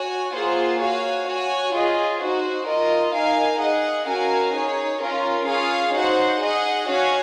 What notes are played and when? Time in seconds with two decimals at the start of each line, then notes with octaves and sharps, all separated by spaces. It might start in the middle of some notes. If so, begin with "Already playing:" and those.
Already playing: F#4 C#5 G#5
0.34 A#3 F4 G#4 C5 F#5
0.81 F#4 C#5 F5 G#5
1.27 F#4 C#5 G#5
1.74 F4 G#4 D#5
2.21 D#4 F#4 C5
2.67 F4 A#4 D#5
3.14 D#4 A#4 F5 G#5
3.60 G#4 D#5 F#5
4.07 C#4 F#4 A#4 F5 G#5
4.54 D#4 G#4 C#5
5.01 C#4 F4 A#4
5.47 C#4 F4 G#4 C#5 F5
5.94 D#4 F#4 C5 F#5
6.41 G#4 D#5 F#5
6.87 C#4 F#4 C#5 F5 G#5